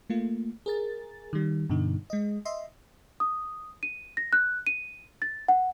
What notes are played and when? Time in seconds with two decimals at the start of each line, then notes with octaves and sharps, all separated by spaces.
0.10 A3 A#3 F4
0.66 G#4 A#4 A6
1.33 D#3 G3
1.69 G2 B2 D3 D#4
2.10 G#3 D#5
2.45 D#5 E5 C6
3.20 D#6
3.83 D#7
4.17 A#6
4.33 F#6
4.67 D#7
5.22 A6
5.48 F#5